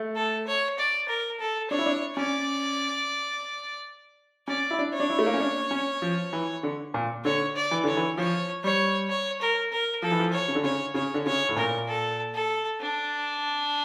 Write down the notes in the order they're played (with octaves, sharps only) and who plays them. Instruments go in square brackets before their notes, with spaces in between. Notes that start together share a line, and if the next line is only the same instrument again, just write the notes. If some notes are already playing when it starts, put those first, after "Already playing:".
Already playing: [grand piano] A3
[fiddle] A4
C#5
D5
A#4
A4
[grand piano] D4 [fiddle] C#5
[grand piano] E4
D4
[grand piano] C#4 [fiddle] D5
[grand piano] C#4 [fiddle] D5
[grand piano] E4
D4
[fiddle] C#5
[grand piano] D4
E4
A3
A#3
C#4
D4
C#4
F3
E3
D3
A#2
[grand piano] D3 [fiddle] C#5
[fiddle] D5
[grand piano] E3
[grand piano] D3 [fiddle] C#5
[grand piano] E3
[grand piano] F3 [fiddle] C#5
[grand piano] G3 [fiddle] C#5
[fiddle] C#5
A#4
A#4
[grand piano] F3 [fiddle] A4
[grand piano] E3
F3
[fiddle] C#5
[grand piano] C#3
D3
[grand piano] C#3 [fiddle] C#5
[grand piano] C#3 [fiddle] C#5
[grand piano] D3
[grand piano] C#3 [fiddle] C#5
[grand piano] A2
[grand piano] A#2 [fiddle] A#4
[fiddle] A4
A4
D4